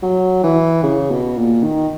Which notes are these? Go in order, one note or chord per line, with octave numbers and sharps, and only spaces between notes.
F#3
E3
C#3
B2
A#2
D#3